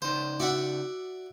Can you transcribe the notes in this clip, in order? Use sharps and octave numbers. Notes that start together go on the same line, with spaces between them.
C#3 D#4 C5
F#4 D5 E5 F#5